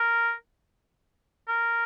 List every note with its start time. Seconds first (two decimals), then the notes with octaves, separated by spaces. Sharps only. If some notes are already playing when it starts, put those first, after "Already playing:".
Already playing: A#4
1.48 A#4